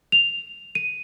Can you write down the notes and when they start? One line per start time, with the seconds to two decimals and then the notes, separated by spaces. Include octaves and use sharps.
0.12 F7
0.75 D#7